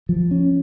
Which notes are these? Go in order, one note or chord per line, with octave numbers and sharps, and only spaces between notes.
F3
C#4